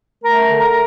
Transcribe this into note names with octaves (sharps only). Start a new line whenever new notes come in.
A3 A#4 A#5
D3
A#4 A#5